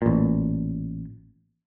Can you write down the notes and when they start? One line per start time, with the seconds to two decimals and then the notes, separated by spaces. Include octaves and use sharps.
0.02 A1 A#2